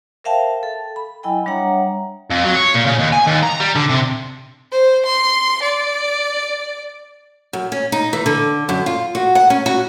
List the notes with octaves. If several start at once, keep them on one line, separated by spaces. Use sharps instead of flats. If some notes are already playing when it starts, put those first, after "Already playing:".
A#4 C5 E5 F5 G5 A5
A4
B5
F#3 E4 D#5 G5 G#5 B5
G3 D4 C#5 E5 F#5 A#5
F2
F#3
C#5
A#2
C#3
D#2
G#5
D#2
A#5
G3
D3
C3
C5
C6
D5
F#2
C#4
D#4
E3
D3
F#2
F4
F#4
F#5
C#4
F#4